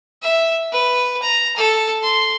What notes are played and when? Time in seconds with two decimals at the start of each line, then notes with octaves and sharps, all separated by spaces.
0.22 E5
0.72 B4
1.22 A#5
1.57 A4
2.03 C6